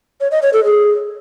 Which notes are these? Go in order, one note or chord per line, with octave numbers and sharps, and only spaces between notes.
C#5
D#5
C#5
A4
G#4